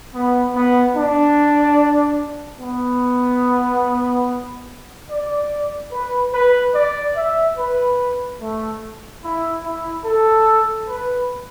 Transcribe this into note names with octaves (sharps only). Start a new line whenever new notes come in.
B3
B3
D4
B3
D5
B4
B4
D5
E5
B4
A3
E4
E4
A4
B4